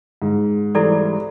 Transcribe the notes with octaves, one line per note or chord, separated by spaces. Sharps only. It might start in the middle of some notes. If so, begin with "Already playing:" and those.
G#2
E3 G3 C4 E4 A4 D5